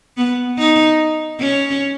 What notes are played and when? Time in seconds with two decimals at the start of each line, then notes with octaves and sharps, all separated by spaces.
0.17 B3
0.58 D#4
1.40 C#4